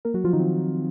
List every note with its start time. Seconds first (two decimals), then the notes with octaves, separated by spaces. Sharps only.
0.05 A#3 A#4
0.14 F#3 F#4
0.24 F3 F4
0.33 D#3 D#4
0.39 C4